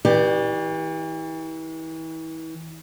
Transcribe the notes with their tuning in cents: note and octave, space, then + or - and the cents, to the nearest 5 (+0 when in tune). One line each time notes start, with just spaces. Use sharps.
E3 -35 G4 +0 D5 +25